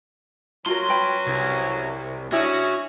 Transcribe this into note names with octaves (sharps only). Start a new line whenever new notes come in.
F#3 C#4 F4 F#4 A#4 C6
B4 G5 B5
C2
C#4 D4 E4 F#4 G#4